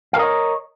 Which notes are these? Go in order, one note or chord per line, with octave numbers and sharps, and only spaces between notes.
A#4 C#5 D#5 F5